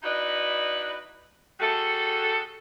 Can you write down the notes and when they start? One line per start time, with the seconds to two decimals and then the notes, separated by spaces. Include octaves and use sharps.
0.03 D#4 E4 F#4 B4 D5 D#5
1.60 G3 F#4 G#4 A4